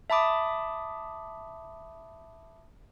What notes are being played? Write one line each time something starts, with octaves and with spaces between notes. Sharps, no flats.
E5 A5 B5 D6 D#6